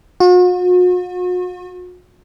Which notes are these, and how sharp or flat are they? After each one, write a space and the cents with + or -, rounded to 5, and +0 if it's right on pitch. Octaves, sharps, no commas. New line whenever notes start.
F#4 -45